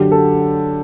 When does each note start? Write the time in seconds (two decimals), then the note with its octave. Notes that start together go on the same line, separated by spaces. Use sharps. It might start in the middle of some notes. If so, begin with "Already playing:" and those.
Already playing: F#2 D3 F#3 G4
0.12 A4